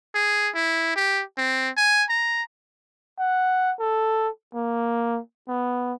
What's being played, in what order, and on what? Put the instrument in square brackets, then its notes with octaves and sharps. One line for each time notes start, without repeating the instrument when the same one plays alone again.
[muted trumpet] G#4
E4
G4
C4
G#5
A#5
[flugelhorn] F#5
A4
A#3
B3